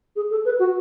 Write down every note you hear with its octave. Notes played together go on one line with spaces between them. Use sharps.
G#4
A4
B4
F#4